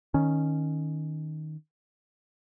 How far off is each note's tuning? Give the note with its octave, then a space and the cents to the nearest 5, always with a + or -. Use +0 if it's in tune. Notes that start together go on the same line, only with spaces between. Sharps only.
D#3 +0 C#4 +0